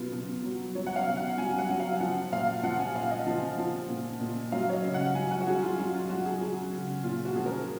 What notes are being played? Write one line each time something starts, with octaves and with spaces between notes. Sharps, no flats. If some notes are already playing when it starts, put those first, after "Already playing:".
Already playing: B2 F#3 F4 B4
B2
F#3
F#3 C#5
F#5
F5
B2
F#5
F#3 G#5
F#5
F#3
F5
F3 F#5
A#2 F5
F3 F#5
G#5
A#2 F5
D#5
F3
F3
A#2
A#2
F#3 F5
C#5
D#5
C#3
F#5
F#3 G#5
F#5
F#4
F#3 G#4
F4
F#3 F4
F4
F#3 F#4
G#4
F#3 G#4
C#3
A#2 F4
F#4
F3 G#4
A#4